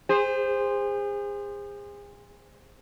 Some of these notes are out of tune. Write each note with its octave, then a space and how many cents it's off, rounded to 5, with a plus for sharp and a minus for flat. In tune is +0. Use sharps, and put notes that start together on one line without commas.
G#4 -35 C5 +0